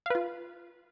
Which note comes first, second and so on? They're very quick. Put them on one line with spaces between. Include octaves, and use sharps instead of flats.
F5 B4 F4